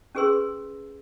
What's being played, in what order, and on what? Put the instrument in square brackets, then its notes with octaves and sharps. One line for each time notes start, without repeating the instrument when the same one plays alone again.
[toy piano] C#4 G4 G#4 B4 C6 E6